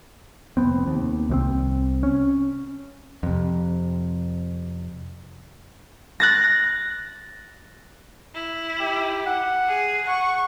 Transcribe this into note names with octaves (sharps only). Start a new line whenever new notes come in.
F1 A#2 B3 C4
D#2
C2 E3 C4
C#4
F2 C3
F#6 A6 A#6
E4
G4
F#5
G#4
F#5 C#6